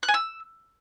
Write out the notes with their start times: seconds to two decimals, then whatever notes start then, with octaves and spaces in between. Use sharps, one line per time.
0.03 F#6
0.08 G#5
0.14 E6